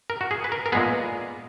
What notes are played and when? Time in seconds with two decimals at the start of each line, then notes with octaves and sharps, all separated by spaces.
0.10 A#4
0.21 F#4
0.31 G#4
0.44 B4
0.52 A#4
0.66 A#4
0.72 A#2 G#3 B3 G#4